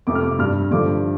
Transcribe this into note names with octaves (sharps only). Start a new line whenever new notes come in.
F2 C3 A3 D6
F6
D6
G2 G3 F6
G2 D3 F3 A3 D6